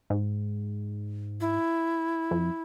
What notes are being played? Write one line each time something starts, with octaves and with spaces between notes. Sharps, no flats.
G#2
E4
F2